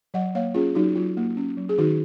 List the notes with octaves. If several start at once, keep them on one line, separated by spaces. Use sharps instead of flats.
F#3 D#5 F#5
A#3 C#5 F5
C#4 F4 G#4
F#3 D#4 F#4
F#3 F4
A#3
C#4
F#3
G#4
D#3 D#4 F#4